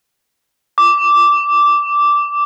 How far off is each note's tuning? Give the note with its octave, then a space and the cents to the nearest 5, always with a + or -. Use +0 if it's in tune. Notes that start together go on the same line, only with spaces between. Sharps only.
D6 -10